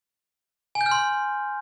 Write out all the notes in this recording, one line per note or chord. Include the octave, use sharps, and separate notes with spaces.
G#5
G6
F6
C6